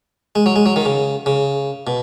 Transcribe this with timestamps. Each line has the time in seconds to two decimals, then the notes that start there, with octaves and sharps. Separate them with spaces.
0.35 G#3
0.46 F#3
0.56 G#3
0.66 F#3
0.76 D#3
0.85 C#3
1.26 C#3
1.87 B2